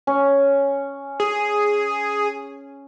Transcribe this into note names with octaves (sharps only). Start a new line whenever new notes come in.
C#4
G#4